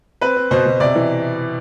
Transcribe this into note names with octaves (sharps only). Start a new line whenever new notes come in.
C4 B4
C4
B2 C5
B2
C3 D5
E3